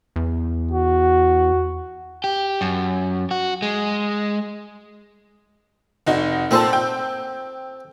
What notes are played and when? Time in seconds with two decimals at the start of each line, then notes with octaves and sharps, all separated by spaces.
0.16 E2
0.71 F#4
2.24 G4
2.61 F#2
3.31 F#4
3.62 G#3
6.06 F1 D#4 F#4
6.51 A#2 C4 A4 C5 A5
6.73 G5